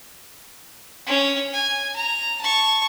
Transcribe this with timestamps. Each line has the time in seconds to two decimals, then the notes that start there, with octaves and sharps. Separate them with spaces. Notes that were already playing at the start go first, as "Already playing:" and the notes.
1.06 C#4
1.53 G#5
1.96 A#5
2.41 A5 C#6